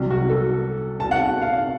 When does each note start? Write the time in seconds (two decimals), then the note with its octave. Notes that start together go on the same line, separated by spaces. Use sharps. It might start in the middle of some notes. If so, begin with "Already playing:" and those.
Already playing: C2 C3 F#3
0.10 F#4
0.29 A4
1.00 A5
1.11 F#5
1.41 F5